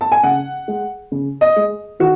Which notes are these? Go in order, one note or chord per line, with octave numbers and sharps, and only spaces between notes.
A5
G#5
C#3 F#5
G#3
C#3
D#5
G#3
D#3 F#4